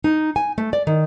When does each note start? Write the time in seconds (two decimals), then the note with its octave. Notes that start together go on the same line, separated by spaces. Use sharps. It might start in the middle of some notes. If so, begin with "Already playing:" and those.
0.04 D#4
0.36 G#5
0.58 A3
0.73 D5
0.87 D#3